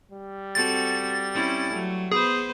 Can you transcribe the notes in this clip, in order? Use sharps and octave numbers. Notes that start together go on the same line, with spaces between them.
G3
C4 F#4 A4 A6
C4 C#4 E4
F#3 A3
B3 G#4 B4 C5